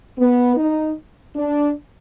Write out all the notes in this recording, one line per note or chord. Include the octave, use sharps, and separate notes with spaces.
B3
D#4
D4